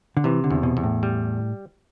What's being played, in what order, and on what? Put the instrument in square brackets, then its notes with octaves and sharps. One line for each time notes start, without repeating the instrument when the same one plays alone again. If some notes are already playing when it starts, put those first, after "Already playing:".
[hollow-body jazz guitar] D3
[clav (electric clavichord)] C3 [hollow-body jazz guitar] E3
[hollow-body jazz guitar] D3
[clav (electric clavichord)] E2
[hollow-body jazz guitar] B2
[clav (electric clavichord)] E2
[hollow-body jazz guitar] A2
[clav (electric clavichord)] G3